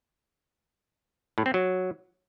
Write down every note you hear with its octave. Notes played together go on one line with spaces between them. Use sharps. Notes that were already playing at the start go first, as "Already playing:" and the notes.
A2
C4
F#3